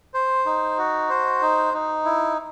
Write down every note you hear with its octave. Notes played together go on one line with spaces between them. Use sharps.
C5
D#4
F#4
C5
D#4
D#4
E4